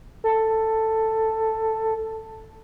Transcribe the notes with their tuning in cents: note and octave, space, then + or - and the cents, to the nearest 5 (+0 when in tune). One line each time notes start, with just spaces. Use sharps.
A4 +10